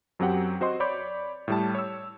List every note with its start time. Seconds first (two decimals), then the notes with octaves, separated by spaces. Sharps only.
0.19 F#2 F#3 C4 G4 F#5 G5
0.60 C4 F#4 C5 D#5 C6
0.80 C#5 D5 B5 D6 G6
1.48 A2 G3 A5
1.75 C#5 E6